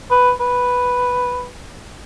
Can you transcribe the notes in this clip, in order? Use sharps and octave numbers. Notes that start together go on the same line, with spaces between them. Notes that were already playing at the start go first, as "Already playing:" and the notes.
B4
B4